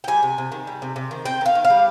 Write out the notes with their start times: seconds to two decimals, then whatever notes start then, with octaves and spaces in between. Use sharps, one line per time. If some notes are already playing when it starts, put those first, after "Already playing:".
0.04 G5
0.08 G3 G#5
0.23 C3
0.38 C3
0.52 D#3
0.67 G3
0.82 C3
0.96 C3
1.11 D#3
1.25 C4 G5
1.41 D#3 F5
1.55 D#3
1.65 F5
1.70 G3